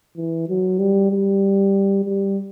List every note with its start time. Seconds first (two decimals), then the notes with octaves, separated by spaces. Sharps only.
0.17 E3
0.49 F#3
0.79 G3
1.11 G3
2.05 G3